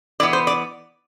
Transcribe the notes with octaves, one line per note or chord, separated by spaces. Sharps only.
E3 B3 D5
C5
D5